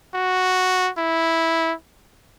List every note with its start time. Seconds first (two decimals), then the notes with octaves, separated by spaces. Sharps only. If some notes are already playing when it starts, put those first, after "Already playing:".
0.14 F#4
0.98 E4